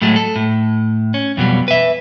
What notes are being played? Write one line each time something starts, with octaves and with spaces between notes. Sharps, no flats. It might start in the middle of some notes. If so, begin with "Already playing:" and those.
A2 F#3 G#3 A3
A4
A2
C#4
F2 B2 F#3 G3
B4 E5